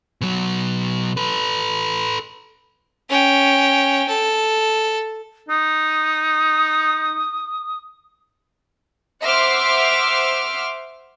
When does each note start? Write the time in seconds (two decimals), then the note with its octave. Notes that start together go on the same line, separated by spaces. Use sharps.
0.21 B2 F#3
1.17 A4 B4
3.09 C#4 G5
4.08 A4
5.49 D#4 D#6
9.24 C5 E5 F#5 C6 D6 F6